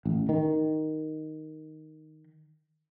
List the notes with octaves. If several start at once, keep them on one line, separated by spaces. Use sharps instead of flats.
A1
D#3